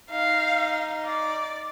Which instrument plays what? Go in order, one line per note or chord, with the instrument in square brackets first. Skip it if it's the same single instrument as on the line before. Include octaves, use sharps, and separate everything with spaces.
[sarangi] D#4 [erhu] F5
[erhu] D5